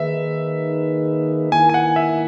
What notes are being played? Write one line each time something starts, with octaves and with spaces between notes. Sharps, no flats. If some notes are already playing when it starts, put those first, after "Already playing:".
Already playing: D#3 A#3 D#4 G#4 B4 E5
D#3 A#3 E4 G#5
G#5
F#5
E5